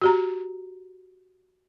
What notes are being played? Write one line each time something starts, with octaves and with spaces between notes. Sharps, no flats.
F#4 G4 A#5